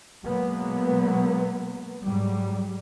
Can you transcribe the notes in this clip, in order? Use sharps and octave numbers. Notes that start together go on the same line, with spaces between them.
B2 F#3 G#3 A#3 B3
G#2 F#3 G3